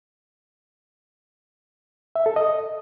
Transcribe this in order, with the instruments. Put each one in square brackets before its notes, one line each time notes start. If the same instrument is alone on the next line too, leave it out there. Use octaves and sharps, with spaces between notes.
[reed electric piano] E5
A4
D#5